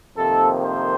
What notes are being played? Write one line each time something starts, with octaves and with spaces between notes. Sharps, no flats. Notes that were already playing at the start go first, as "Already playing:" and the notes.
F2 C3 D#3 A#3 A4
C5